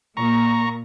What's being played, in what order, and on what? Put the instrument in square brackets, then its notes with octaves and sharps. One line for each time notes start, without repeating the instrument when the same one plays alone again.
[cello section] A#2 [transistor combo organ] A#5 C#6